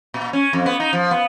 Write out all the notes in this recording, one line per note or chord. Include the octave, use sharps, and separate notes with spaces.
A#2
C#4
F2
B3
D#4
F3
B3